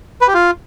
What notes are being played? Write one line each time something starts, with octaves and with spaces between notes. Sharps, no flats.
B4
G4
F4